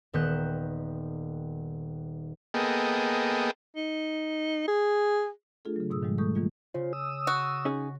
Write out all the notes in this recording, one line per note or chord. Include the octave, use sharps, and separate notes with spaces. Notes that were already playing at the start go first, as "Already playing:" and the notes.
D#1 D#3 B3 F#6 G6 E7
A#3 B3 G#4 A4 D#5 G5
D#4
G#4
A3 D4 F4 G#4 A4
C#3 F#3
G#2 B2 G#4 D#6 E6
G#2 D#3 F3 G3 G#3
G3 A3 A4 C#6 D#6 G6
D#3 E3 G3 A#3 F4
C#3 F4 C5
D#6 E6
F#4
C#4 D#4 G#4